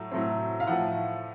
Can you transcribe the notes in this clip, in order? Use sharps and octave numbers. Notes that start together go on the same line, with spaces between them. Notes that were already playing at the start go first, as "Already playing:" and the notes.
Already playing: A2 F#3 A3
A2 F#3 A3 C4
F5
A2 F3 A3 F#5